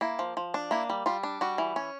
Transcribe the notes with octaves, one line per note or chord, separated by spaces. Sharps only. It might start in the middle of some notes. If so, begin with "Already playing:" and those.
A#3 E4
F3
F3
D4
A#3 E4
G3
G3 F4
D4
G3 F#4
E3
C#4